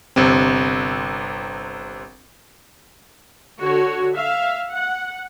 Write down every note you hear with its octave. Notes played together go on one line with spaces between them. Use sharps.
G1 C3 C4
D3 F#4 C#5
E5 F5
F#5